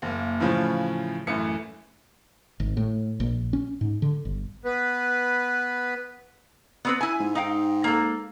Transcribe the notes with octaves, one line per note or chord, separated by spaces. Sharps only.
F#1 A#3
A2 C#3 E3 F3 C#4 F4
A1 F#2 E3 A3 C#7
G#1
A2
A#1
C#4
G#2
D3
G1
B3 B4
B3 C4 B4
E4 G#5
G#2
D#4 F5 G5
A#3 A4